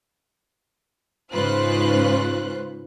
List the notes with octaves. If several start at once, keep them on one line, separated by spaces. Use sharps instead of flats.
G#2 C#3 F4 B4 C5 F#6